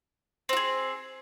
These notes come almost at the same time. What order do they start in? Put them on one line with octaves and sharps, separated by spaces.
C4 F#4 G#4